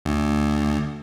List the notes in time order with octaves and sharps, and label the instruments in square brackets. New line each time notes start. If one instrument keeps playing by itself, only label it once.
[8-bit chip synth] D2